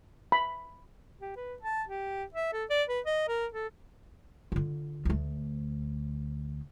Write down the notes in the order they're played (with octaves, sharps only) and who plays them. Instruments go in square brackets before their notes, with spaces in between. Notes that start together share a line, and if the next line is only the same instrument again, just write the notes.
[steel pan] B5
[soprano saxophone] G4
B4
A5
G4
E5
A4
D5
B4
D#5
A#4
A4
[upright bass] D3 F4
D2 A3